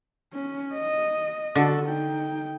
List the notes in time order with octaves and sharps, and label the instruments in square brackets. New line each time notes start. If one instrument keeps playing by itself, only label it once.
[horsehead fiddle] C#4
D#5
[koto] D3 [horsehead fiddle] F#4 A4
[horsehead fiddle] D#4 G5